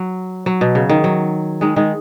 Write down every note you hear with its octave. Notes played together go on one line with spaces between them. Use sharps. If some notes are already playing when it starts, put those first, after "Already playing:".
Already playing: F#3
F#3
B2
C#3
D#3
F#3
D#3 G#3
D#3 G#3